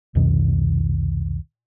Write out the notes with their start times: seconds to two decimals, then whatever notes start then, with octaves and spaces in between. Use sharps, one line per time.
0.15 C2 F2 B2 D#3